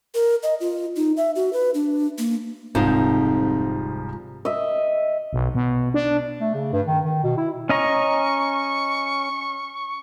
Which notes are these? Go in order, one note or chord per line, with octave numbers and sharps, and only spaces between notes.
A#4
D#5
F4
D#4
E5
F#4
B4
D4
A#3
D1 C2 F2 G#2 F3 G4
D#5 E5
B1
B2
D4
A3
C#3
G2
D#3
D#3
B2
E4
C#4 D#5 A#5 C#6